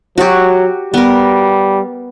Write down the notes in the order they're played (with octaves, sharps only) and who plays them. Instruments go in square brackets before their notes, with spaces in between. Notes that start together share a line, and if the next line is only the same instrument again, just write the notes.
[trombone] F#3 [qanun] F#4 G4
[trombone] G3 [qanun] B3 A#4